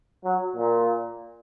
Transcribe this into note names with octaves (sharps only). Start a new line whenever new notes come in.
F#3
A#2